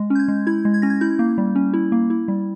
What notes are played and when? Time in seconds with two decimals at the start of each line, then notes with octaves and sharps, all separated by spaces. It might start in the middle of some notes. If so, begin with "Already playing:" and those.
Already playing: G#3
0.10 C#4
0.15 G6
0.19 G#6
0.28 G#3
0.47 E4 G#6
0.65 G#3
0.74 G#6
0.82 C#4 A#6
0.90 G#6
1.01 E4 G6
1.19 A#3
1.38 G3
1.55 C#4
1.74 E4
1.92 A#3
2.10 E4
2.28 G3